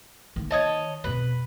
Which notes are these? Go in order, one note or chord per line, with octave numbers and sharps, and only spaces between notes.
D#3 A#3
C#5 D#5 A5
F2 B2 B4